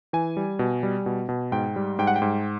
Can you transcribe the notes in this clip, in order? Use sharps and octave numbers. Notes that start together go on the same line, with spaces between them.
E3 G#5
G3
B2
G3
B2
B2
G#2 G5
G3
G#2 G5
F#5
G5
G#2